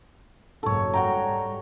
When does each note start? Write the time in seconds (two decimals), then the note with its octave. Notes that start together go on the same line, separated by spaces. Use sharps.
0.63 F#1 B1 G#2 A4 C#5
0.93 G#2 G3 F#4 G5 A#5